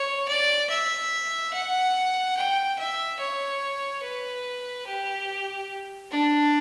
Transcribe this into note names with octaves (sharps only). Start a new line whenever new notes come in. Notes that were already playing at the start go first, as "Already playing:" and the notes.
Already playing: C#5
D5
E5
F#5
G5
E5
C#5
B4
G4
D4